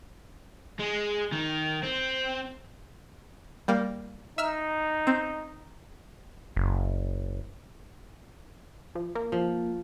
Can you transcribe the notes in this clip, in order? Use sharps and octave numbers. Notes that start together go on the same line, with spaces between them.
G#3
D#3
C4
G3 A#3
D#4 E5 E6 F6
C4
F#1
F3
A#3
F3